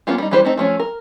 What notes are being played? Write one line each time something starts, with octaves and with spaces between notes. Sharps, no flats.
A#3 B3 C#4 F4 G4
G3 D#4
E3 G3 G4 B4 C5
A3 C4 D#4
F3 A3 C#4
A#4